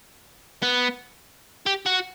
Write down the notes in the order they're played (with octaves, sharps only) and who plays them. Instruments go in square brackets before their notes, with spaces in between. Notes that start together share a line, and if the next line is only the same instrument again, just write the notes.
[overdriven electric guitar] B3
G4
F#4